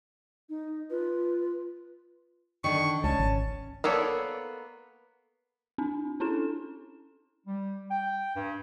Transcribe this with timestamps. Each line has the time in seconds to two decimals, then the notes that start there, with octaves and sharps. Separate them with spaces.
0.49 D#4
0.90 F4 B4
2.64 D3 D#3 C#6
3.04 C#2 C#4 A5
3.19 G#1
3.84 A#3 B3 A4 C#5 D5
5.78 C4 D4
6.20 C#4 D4 E4 A4 E7
7.47 G3
7.90 G5
8.36 G2